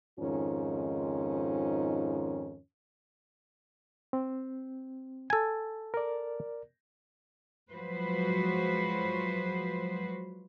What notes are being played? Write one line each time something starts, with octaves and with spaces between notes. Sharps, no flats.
F2 G#2 D#3 C#4 F4
C4
A4 G#5
A#4 D5
F3 F#3 G#3 F#4 B4 C5